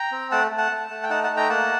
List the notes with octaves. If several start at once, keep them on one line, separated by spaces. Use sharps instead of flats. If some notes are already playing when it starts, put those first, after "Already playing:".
Already playing: G5 A#5
C4
A3 F#5 A5
A3
F#5 A5
A3
A3
G5
D#4 F#5 A5
F#5 A5
A3
G5 A#5
A#3 F#5 A5